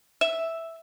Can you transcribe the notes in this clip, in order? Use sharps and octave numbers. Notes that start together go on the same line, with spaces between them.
E5